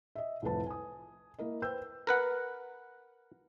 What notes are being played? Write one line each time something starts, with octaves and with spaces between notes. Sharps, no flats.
D#5 E5
C2 F2 A2 B4 A5
G#5 D#6
A#3 E4 A#4 D#5
B4 C5 G5 E6 G6
A#4 B4 F#5